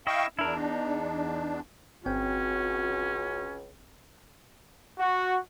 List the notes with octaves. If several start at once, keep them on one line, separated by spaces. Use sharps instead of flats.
E4 D#5 F5 G5 C#6
E2 D4 E4 A#4
D#4
G1 C#2 C4 C#4 F#4 G5
F#4